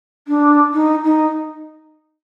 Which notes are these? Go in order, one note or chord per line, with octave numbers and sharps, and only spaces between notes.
D4
D#4
D#4